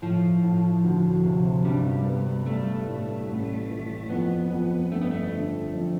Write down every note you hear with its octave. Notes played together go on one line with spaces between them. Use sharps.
A2 F3
A2
D2
C3
G2 G3
B3
G3 A3
A2
A1
E3
F2 B3
F2
G2 A3
B3
A3
D3
F2